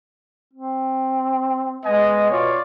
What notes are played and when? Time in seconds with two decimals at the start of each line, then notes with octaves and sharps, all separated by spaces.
0.54 C4
1.85 G#3 B3 D#5 G#5
2.31 B2 F4 C#5 D5